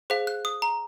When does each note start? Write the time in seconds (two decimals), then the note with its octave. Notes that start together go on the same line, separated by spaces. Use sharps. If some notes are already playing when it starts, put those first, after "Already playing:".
0.10 G#4 C5 F5
0.27 F#6
0.45 D#6
0.62 A#5